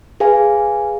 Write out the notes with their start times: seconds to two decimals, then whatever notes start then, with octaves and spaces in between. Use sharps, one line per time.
0.20 G#4 B4 F5 G#5